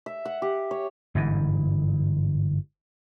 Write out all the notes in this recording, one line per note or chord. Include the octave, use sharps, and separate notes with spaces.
E5
F#5
G4
C#5
G1 G#2 E3